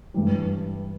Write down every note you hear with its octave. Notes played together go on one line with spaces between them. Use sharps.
G2 E3 G3